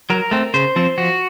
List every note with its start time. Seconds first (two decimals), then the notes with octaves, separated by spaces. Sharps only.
0.10 F#3 A#4
0.31 A3 C4
0.54 C#3 C5
0.76 F3 C4
0.98 F3 F#4